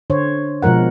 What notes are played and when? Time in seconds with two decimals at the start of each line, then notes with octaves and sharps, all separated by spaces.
0.10 D3 C5 C#5
0.62 B2 F3 G#3 A#4 F#5